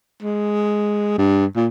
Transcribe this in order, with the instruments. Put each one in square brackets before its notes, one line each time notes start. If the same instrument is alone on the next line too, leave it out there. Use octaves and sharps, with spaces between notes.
[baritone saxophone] G#3
G2
A#2